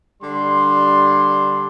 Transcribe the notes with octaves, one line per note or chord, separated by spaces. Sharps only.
D3 G3 D4 C6